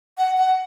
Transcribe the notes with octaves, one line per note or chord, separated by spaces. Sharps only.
F#5
F#5